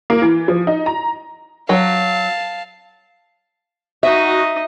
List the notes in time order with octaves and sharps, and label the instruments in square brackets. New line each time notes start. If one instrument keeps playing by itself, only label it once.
[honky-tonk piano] A#3
E3
F3
D#4
A#5
[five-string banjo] F#3 [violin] F5 A5
[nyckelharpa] D#4 D#5 [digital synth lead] F#4 [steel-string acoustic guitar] E5